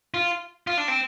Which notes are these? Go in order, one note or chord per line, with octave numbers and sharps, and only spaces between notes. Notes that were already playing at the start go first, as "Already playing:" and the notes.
F4
F4
D4
C4